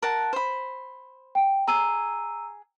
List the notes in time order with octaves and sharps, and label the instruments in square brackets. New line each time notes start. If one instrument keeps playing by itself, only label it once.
[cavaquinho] A#4 F#5 A5
C5 B5
[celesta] G5
[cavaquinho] G#4 [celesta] A#5 E6 D#7